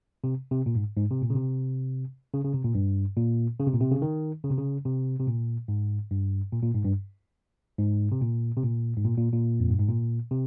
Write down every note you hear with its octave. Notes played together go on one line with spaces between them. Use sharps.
C3
C3
A#2
G#2
G#2
C3
A#2
C#3
C3
C#3
C#3
C3
A#2
G2
A#2
C#3
C3
A#2
C3
C#3
D#3
C#3
C3
C#3
C3
C3
A#2
G#2
G2
A#2
A#2
G#2
G2
G#2
C3
A#2
C3
A#2
G#2
A#2
A#2
A#2
F2
G2
G#2
A#2
C3